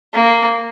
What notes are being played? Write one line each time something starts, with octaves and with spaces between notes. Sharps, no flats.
A#3